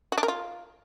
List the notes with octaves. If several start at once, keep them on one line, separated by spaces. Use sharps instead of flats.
F#4
D4
A#4
F4